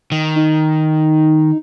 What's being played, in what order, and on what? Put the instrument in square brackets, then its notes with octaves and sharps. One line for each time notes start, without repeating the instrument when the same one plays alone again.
[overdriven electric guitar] D#3
[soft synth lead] D#4